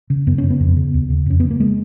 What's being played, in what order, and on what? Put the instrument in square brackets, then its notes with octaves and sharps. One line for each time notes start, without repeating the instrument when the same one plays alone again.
[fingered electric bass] C#3
F#2 B3
C#4
C#3
B3
F2
C#3
D#2
C#3
F2 C#4
C#3 B3
A#3
G#3